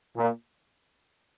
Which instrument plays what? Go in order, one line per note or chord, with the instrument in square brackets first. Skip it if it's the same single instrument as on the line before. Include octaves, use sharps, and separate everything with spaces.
[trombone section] A#2